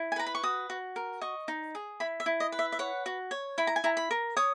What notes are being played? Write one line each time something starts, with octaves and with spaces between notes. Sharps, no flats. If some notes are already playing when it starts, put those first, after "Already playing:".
Already playing: E4
G#5
B4 A#5
B5
C#6
F#4 D#6
F#4
A#4
D#5 C#6
D#4
G#4
E4 B5
E5
E4
D#5
B4
E5
E5
C#5 F#5
F#4
C#5
E4 B5
A#5
G#5
E4 A#5
B5
A#4
C#5 D#6